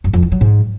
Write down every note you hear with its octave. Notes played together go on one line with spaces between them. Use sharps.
F#2
F2
E3
F#3
G#2